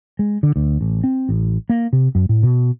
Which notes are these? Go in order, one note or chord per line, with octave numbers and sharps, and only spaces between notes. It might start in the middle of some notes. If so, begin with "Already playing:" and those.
G#3
D3
D2
A1
C4
A1
A#3
C3
F#2
A2
B2